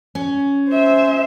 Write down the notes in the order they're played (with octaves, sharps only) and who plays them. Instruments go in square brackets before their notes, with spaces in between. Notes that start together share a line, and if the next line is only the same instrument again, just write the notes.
[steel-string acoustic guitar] C#4
[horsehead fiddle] C5 E5